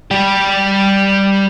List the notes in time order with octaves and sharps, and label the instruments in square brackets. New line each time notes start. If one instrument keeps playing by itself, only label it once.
[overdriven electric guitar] G3 G4